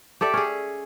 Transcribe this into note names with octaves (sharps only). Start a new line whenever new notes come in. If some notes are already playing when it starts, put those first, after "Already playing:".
G4 A4 D5 E5
C#4 G#4